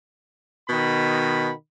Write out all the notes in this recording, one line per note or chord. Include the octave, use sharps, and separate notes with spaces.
B2 D#3 B5